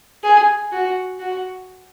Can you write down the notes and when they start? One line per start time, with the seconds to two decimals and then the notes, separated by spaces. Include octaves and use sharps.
0.23 G#4
0.72 F#4
1.20 F#4